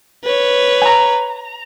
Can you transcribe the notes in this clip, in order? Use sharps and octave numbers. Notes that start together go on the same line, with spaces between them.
B4 C#5
G#5 A#5